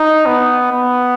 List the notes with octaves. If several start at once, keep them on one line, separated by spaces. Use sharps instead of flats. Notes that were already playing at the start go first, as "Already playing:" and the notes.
Already playing: D#4
B3
B3